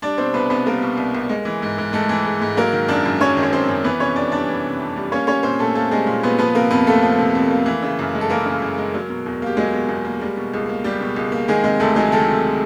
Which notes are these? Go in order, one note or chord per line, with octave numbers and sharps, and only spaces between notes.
G3 D4 D5
B2 C4 C5
C2 B3 B4
C2 B3 B4
G3 A#3 A#4
B2
C2
C2
G#3
E3
G#2
G#2
G#3 A3 A4
E3
G#2
G#2
F#3 A#3 A#4
D#3
F#2 D4 D5
F#2
F#3 C#4 C#5
D#3
C#5
F#2 C4 C5
F#2
E3 B3 B4
C3 C#4 C#5
F2 D4 D5
G3 D4 D5
E3
C3
F2
G3
A#3 C#4 C#5
G3 C#4 C#5
A#2 C4 C5
A#2 A3 A4
A3 A#3 A4
G3 G#3 G#4
A#2
A#2 B3 B4
F3 B3 B4
C3 A#3 A#4
F2 B3 B4
A3 A#3 A4
F3
C3
F2
A#3
E3
C#3
F#2
G#3
A4
E3 A#3 A#4
C#3
F#2
G#3
F#3
B2
E2
A#3 G4
F#3 G#3 G#4
B2
E2
A#3
G3
B2
C#2
A#3
G3 G4
B2
C#2
A#3
D#3 G#3 G#4
C3 G#3 G#4
D2 A3 A4
F#3 G#3 G#4
D#3 A3 A4
C3